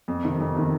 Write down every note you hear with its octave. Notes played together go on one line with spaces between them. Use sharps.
F2
C3 D#3
F2
C3 D#3